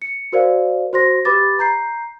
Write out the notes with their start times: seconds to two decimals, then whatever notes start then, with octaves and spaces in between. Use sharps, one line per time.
0.02 C#7
0.32 F#4 A#4 C5 D5 F5
0.93 F#4 C5 C6 A#6
1.25 G4 B4 B5 D6 A6
1.59 A#5 G6 C7